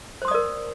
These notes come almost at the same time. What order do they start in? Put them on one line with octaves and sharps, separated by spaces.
C5 C6 D#6 D5 A#4